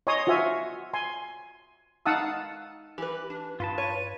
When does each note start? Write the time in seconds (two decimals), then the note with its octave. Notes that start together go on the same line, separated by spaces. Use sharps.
0.07 C#5 D#5 G#5 A#5 C6 D#6
0.27 F4 F#4 C5 E5 G#5
0.93 G#5 C6
2.06 D#4 F5 F#5 A5 D#6 E6
2.98 E3 G4 B4
3.30 D4
3.60 G2 F4 B4 A5
3.78 C#5 D#7